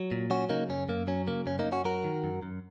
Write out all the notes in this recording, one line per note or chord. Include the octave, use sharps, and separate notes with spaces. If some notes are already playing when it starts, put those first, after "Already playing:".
Already playing: F#3
A#2
F#3 C#4 F#4
C#3 A#3 D#4
F#2 C#4
F#2 A#3
F#3 C#4
C#3 A#3
F#2 C#4
A#3 D#4
F#2
C#4 F#4
F#3 F#4 A#4
D#3
F#2
F#2